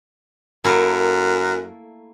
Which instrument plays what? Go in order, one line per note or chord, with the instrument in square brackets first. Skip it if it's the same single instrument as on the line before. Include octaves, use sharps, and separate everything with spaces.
[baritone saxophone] F#2 [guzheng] A3 A#3 E4